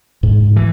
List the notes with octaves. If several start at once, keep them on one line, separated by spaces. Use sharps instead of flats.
G#2
E3